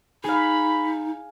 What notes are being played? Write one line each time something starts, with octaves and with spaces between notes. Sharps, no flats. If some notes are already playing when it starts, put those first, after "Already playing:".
D#4 G#4 F5 B5